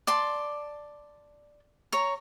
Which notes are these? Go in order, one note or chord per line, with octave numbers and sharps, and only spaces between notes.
D5 A5 C6
C#5 A#5